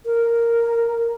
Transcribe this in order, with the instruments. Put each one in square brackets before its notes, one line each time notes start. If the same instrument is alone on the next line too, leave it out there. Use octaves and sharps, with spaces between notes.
[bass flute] A#4